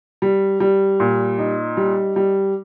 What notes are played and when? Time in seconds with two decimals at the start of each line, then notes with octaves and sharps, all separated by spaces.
0.22 G3
0.60 G3
1.00 A#2
1.38 D#4
1.77 G3
2.16 G3